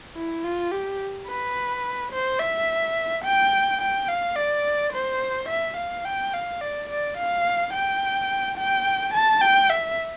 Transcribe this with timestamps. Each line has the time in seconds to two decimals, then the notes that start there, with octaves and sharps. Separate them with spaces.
0.15 E4
0.44 F4
0.72 G4
1.28 B4
2.12 C5
2.40 E5
3.24 G5
3.81 G5
4.08 F5
4.36 D5
4.92 C5
5.49 E5
5.77 F5
6.05 G5
6.33 F5
6.61 D5
6.89 D5
7.17 F5
7.73 G5
8.58 G5
9.14 A5
9.42 G5
9.70 E5